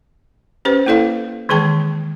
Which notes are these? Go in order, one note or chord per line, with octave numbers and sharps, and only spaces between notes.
C#4 G4 B4 C5
A#3 E4 A4 D5 F5
D#3 E3 G#3 G#4 G5 A5